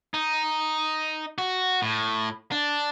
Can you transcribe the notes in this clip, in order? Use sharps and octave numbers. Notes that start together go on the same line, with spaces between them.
D#4
F#4
A2
D4